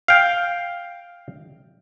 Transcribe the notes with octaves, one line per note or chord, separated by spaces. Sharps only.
F5 G5